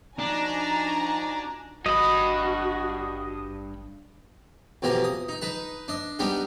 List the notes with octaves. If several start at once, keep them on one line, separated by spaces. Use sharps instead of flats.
F3 D4 D#4 F#4 G#5 A#5
G#1 G2 F#4 D#5 B5
F2 B2 E3 G4 A#4
D#6
D#4
D#4 B4 A5
D4 D#5
G3 B3 D4 D#4 G4